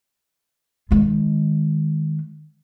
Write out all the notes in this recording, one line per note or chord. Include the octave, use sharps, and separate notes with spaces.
D#3 G#3